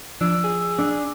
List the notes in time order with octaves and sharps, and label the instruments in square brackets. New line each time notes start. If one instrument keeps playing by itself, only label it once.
[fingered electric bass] F3 [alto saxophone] D4 [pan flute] E6
[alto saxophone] G#4
[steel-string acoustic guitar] D4